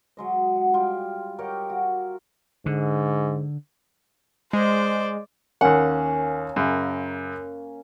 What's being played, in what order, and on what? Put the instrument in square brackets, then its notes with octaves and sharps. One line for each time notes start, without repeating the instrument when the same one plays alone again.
[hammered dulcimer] F#3 G#3 D#5
F#5
G3 F4 G5
G4 A#4 C#5 D#5
F#4
[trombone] G#2 [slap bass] D3
[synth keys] G#3 [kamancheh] C5 D5
[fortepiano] D#2 F#5 [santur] A#3 C#4
[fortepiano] F#2 C#3